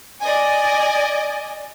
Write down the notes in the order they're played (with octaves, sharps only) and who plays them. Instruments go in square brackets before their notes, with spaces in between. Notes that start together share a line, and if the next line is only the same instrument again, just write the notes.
[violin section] D5 D#5 G#5